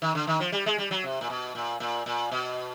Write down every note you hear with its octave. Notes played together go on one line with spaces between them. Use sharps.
D#3
D3
D#3
F3
G3
G#3
G3
F#3
C3
A#2
B2
A#2
A#2
A#2
B2